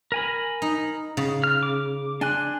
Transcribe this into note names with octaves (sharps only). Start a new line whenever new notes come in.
A#4 G#5 B5
D#4
C#3
F6
D6
D4 G#5 C6 F#6